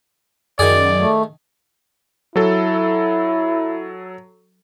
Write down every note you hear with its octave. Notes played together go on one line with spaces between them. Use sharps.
F#2 D#3 G#4 D5
A3
F#3 E4 A4